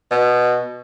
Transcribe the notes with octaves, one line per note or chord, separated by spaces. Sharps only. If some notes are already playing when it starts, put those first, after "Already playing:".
B2